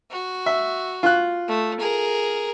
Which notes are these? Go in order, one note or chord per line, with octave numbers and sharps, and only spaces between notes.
F#4
E5
F4 F#6
A3
G#4 A#4